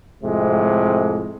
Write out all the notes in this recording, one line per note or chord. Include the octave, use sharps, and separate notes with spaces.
F2 A2 C3 G#3